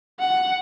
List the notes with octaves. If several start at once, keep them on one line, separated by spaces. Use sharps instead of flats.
F#5